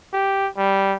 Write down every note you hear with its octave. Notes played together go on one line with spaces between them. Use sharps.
G4
G3